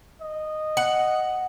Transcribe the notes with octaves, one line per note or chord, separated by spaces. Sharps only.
D#5
F#5